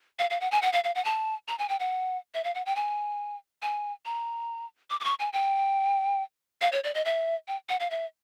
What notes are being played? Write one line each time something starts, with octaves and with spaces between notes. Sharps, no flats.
F5
F5
F#5
G#5
F#5
F5
F5
F#5
A5
A#5
G#5
G5
F#5
E5
F5
F#5
G5
G#5
G#5
A#5
D6
D6
C#6
G#5
G5
F5
C#5
D5
D#5
E5
G5
F#5
F5
E5